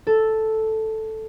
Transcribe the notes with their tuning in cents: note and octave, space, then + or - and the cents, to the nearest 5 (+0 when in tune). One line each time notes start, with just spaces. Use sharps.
A4 +0 E6 +0